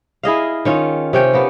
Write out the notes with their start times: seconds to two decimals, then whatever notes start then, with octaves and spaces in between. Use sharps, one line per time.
0.23 E4 G#4 D#5 F5
0.65 D#3 C#4 F4
1.13 C3 C#4 G5
1.33 A#3 B3